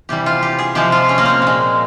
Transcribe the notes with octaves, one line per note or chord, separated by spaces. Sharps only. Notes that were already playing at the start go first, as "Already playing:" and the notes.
C3 E3 G3 G4
F4
G4
G#4
C3 F3 G#3 G4
F4
C#4
A#3
C4
A#2 G#3